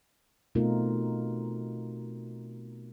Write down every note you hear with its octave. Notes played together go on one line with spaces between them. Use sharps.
B2 A3 C4 D#4 F4 A#4